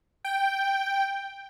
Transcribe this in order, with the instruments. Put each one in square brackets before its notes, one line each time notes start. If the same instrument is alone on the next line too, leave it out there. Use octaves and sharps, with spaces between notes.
[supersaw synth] G5